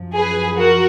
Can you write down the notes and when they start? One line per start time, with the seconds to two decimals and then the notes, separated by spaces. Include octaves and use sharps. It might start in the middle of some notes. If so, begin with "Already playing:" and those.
Already playing: F#2 F3
0.15 G#4 B4
0.58 F#4 A#4